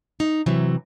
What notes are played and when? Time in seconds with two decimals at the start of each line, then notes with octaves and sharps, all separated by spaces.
0.20 D#4
0.46 C3 E3 F#3